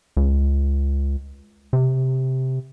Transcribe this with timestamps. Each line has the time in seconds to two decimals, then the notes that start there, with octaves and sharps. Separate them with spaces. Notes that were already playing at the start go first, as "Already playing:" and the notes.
0.17 C#2
1.73 C3